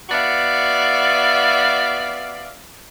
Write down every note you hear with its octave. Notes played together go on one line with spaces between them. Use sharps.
B3 F#4 D5 E5 F5